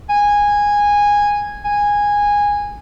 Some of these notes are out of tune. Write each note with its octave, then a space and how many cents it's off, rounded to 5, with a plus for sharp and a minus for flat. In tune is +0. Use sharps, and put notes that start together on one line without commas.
G#5 -10
G#5 -15